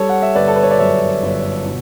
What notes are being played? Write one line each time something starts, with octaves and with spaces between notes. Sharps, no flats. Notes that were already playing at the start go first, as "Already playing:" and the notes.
Already playing: G3 A4 C#5
F#5
E5
G1 B4 D5
A4
B4
C#5
D5
F#2 C#5 E5
G1
B2